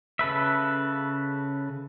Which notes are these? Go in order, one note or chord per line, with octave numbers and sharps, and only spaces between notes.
C#3 A4 B4 E5